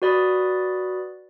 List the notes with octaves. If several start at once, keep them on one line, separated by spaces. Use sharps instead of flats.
F#4 B4 D5 B5 D#6